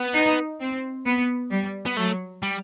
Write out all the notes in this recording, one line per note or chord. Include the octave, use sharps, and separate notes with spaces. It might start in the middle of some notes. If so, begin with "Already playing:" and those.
Already playing: B3
D#4
C4
B3
G3
B3
F#3 A3
G3